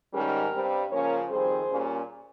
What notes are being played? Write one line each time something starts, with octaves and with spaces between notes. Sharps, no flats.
G#2 D#3 G3 C#4 G4 A#4
G2 G3 C4
C#3 F3 A#3 C#4 A#4 C#5
F2 D#3 G3 C4 G#4 C5
A#2 G3 A#3 C#4